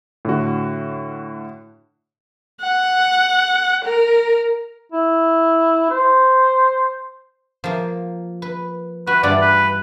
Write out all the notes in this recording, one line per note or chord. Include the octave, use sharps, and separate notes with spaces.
A2 D3 F#4
F#5
A#4
E4
C5
F3 A#3
B4
F#4 B4
G2 E3 F4 D5
B4